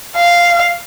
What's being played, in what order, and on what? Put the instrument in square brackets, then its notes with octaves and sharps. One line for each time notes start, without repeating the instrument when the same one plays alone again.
[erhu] F5